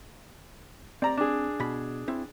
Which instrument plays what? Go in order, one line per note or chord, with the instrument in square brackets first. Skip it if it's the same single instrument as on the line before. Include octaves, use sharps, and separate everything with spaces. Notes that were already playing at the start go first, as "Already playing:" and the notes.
[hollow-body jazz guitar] C4 [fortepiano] D5 A#5
[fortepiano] D4 G#4
[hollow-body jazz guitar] B2 B5
C4 E4